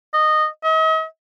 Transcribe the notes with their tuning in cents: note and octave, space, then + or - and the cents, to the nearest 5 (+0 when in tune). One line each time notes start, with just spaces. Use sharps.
D#5 -15
D#5 +45